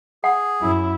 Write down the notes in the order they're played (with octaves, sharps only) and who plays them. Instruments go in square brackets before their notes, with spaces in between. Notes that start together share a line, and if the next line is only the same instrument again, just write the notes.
[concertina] G#4 [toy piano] F#5
[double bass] F#2 E4